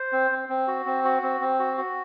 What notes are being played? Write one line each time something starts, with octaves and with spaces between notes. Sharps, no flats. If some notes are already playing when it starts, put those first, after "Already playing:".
Already playing: C5
C4
C4
C4
F#4
C4
F#4
C4
C4
F#4
F#4